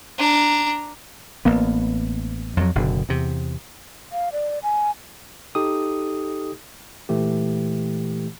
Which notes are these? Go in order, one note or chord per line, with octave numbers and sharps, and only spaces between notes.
D4 A#5
A1 A#3 B3
F2 F#3
F#1 B2 D3
E2 C3
F5
D5
G#5
D#4 G4 A4 D#6
A#2 E3 A3 G4